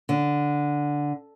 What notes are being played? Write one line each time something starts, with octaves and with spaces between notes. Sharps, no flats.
D3